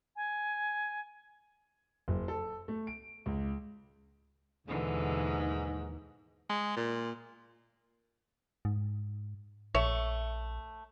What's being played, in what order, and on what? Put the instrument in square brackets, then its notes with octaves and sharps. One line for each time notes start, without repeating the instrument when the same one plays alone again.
[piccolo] G#5
[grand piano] F#1
A4
A3
D7
C#2
[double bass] D#2 [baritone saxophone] G#2 [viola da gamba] B2 D3 E3
[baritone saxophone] G#3
A#2
[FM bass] G#2
[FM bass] A#1 [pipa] A3 C#5 E5